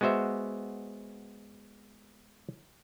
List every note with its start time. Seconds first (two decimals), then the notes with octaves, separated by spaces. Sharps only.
0.01 G#3 B3 F#4 C5 E5